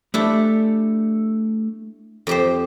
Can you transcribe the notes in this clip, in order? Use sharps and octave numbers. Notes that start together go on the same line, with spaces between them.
A3 D4 E4 G4 A4
F2 G4 C5